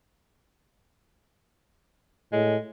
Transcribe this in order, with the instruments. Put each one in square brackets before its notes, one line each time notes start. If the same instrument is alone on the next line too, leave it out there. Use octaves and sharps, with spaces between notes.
[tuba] A2 [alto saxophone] G#3